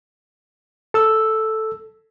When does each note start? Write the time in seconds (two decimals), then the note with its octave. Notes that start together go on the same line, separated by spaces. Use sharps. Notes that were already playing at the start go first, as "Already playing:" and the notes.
0.94 A4 E6